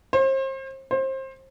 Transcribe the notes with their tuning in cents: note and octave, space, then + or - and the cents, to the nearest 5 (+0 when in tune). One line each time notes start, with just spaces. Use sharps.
C5 +35
C5 +25